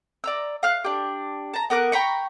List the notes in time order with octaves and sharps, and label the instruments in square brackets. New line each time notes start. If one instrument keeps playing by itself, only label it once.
[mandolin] D5 A#5 E6
F5 F6 F#6
D4 G4
A5 A#5
B3 A#4 D6 F#6
G5 A#5 B5 C#6